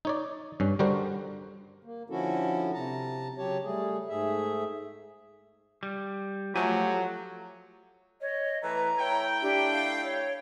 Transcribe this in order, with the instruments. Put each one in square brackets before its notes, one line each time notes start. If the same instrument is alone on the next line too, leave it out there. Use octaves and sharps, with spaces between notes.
[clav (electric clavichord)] D#4 C#5 D5
G2 C#4
D3 G3 D4 F#4 A#4 C5
[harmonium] A#3
D3 F3 C#4 E4 F#4 A4
C3 A5 A#5
C#3 F#3 G4 C#5 A5
G3 A3 G#4
G#2 A3 G#4 E5
[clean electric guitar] G3
[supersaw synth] F3 A3 [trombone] F#3 [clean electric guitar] G4 G#5
[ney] C#5 [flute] D#5
[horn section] E3 A3 [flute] B4 [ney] A#5
[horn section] A3 E4 G5 [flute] C#5
[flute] D4 [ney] G4
[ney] F5
[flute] C#5